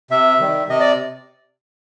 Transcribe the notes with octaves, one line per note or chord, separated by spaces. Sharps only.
C3 E5
D#3 G3
C3 D#5
D5